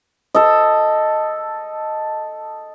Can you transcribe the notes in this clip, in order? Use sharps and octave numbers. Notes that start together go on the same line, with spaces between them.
A4 D#5